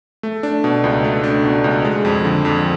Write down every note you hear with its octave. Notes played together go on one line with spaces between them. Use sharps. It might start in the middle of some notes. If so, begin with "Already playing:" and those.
A3
D4
B2
C#2
A3
D4
B2
C#2
G#3
F2
D3
F2